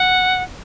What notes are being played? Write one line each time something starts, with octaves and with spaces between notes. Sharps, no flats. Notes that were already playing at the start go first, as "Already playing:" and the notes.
Already playing: F#5